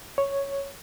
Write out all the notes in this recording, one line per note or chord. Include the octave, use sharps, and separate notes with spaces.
C#5